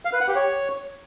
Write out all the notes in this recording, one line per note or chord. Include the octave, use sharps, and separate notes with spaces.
F5
B4
F#5
G4
C#5